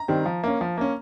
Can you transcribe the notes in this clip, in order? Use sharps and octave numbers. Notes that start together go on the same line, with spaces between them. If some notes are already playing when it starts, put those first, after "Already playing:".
Already playing: A#5
D#3 G3 C4
F3
A#3 C#4
F3
A#3 C#4